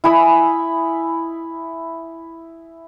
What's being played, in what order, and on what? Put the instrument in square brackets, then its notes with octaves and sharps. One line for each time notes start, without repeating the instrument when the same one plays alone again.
[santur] E4 G#5 B5 D#6